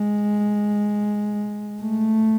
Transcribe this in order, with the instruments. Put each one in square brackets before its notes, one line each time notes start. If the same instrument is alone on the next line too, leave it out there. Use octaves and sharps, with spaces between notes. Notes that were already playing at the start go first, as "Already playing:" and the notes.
Already playing: [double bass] G#3
A3